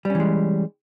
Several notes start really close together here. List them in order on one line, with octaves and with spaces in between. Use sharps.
G3 C#4 E3 G#3